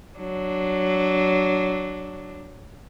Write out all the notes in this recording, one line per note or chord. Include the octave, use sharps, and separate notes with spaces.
F#3 D4